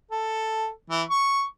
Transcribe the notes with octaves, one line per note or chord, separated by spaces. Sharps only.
A4
E3
C#6